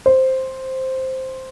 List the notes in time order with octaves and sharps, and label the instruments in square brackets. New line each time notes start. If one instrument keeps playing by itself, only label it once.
[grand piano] C5